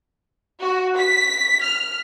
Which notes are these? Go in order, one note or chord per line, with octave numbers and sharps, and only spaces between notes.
F#4
B6
F6